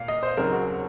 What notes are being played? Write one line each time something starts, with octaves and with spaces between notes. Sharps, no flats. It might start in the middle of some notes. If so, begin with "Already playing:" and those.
Already playing: A#2 F5
D#5
C5
D#2 C#3 F#3 C4 A#4
F#4